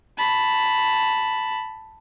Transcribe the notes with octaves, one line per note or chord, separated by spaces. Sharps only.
A5 B5